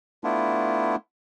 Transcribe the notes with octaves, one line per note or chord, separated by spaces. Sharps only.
A3 B3 D4 E4 F4